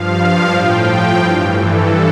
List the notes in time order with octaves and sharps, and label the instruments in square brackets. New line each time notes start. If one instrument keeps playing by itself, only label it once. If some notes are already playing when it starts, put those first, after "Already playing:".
Already playing: [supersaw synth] G2 F3 F5
A2 F3 G5
G2 E3 F5
A4